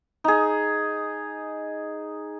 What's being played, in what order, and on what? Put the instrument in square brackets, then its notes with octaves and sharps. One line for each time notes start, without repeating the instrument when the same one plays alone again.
[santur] D#4 G#4